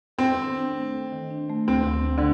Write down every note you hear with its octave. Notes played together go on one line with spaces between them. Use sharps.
C4 A4
D#3
D4
A3
A4
D#3
D4
A3
D2 C4
D2
A3
D3